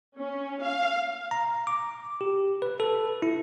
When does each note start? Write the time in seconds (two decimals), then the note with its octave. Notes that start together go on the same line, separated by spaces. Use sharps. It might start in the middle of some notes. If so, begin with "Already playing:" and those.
0.17 C#4
0.61 F5
1.31 A#5
1.67 D6
2.21 G4
2.62 B4
2.80 A4
3.22 E4